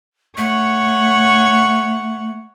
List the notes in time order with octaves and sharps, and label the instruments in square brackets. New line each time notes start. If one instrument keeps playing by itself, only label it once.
[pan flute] A3 [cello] C#5 F#5